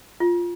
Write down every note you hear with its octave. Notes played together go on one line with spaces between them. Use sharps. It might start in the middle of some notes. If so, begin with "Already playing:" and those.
F4